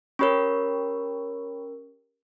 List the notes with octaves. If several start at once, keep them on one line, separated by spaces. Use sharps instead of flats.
C#4 G4 A#4 C#5 B5 C#6